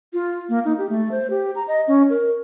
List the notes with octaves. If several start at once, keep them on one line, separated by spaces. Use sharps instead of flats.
F4
A#3
D#4
G4
A3
C5
G4
A#5
D#5
C#4
A#4